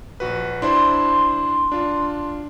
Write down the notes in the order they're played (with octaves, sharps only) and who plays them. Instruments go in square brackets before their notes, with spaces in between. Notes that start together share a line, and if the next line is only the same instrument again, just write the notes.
[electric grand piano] A#1 F#4 B4
[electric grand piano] D4 E4 C5 [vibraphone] C6
[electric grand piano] D4 F4